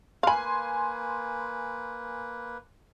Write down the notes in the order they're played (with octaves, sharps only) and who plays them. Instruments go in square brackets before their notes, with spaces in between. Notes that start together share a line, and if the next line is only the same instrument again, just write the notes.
[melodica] A#3 B4 [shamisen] F5 B5 [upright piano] G#5 C6